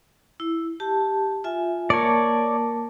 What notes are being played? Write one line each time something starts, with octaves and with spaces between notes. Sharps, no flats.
E4
G4 A5
F4 E5 G#5
A#3 A#4 C#5 D5 A5